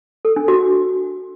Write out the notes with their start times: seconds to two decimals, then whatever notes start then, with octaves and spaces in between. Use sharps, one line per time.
0.25 A4
0.36 D4
0.48 F#4